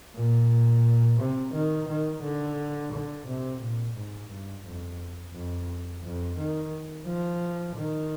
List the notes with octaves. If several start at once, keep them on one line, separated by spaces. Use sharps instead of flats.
A#2
C3
D#3
D#3
D3
D3
C3
A#2
G#2
G2
F2
F2
F2
D#3
F3
D#3